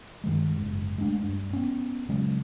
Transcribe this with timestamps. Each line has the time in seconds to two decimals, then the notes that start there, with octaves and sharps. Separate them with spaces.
0.24 G2 D#3 G#3
0.56 F#1 G#2
0.98 G#3 A3 D4
1.23 G2
1.53 B3 C#4
2.09 C#3 F#3 G#3 C#4